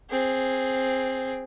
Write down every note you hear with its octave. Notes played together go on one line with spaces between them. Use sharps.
C4 G#4